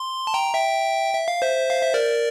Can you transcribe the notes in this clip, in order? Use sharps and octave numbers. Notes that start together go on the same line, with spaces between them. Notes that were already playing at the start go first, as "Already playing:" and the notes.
Already playing: C6
A5
G5 A#5
E5 G5
E5
F5
C5 E5
F5
E5
A#4 D5